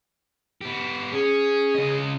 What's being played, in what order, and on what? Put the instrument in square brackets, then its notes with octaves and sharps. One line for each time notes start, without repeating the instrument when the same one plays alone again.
[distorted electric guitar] B3 G4
[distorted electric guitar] C#4 [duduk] G#4
[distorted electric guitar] C#3 D#5